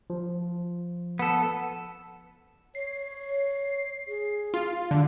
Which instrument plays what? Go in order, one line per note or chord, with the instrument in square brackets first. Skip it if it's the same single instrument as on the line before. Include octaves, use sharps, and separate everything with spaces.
[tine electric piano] F3
[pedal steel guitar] B3 A4
[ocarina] C#5 [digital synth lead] C7
[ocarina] G#4
[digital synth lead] F4
[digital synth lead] D3 [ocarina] F5